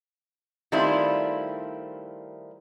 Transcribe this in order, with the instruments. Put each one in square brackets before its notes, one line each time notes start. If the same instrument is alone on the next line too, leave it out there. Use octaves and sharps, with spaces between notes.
[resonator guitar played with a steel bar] D#3 G3 A3 C4 E4 F4